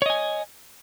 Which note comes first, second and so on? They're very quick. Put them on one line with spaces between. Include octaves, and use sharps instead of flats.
C#5 D#5 G#5